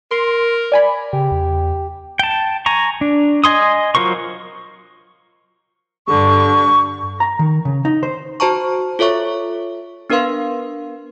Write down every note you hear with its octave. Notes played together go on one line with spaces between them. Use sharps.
A#4 C6
D5 G#5 B5
C#3 G4
E2
G5 A5
G#5 A#5 C#6
D4
D#5 G#5 C6 D#6
F#3 F4 A#4 C5 C#6
G2 D3 C#6
A#5
D#3
C#3
D#4
C5
F#4 C5 A5 A#5 C#6
F4 A4 C#5 E5 C#6
B3 D4 A#4 B4 F5 C6